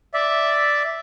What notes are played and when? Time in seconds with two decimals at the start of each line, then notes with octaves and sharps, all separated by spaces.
0.14 D5 E5